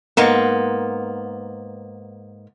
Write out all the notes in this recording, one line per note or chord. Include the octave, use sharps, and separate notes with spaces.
G#2 A#3 B3